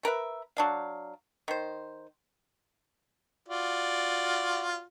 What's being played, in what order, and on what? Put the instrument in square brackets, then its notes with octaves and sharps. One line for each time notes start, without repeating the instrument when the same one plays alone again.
[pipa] A3 A#4 B4 E5
F#3 D4 F5
D#3 C5
[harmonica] F4 F#4 D5